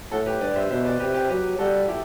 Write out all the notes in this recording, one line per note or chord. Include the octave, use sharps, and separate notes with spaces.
A2 F#4 A4
G4 B4
G2 B4 D5
C5 E5
B2 C5 E5
B4 D5
C3 G4 B4
G4 B4
F#3 G4 B4
G3 F#4 A4
E4 G4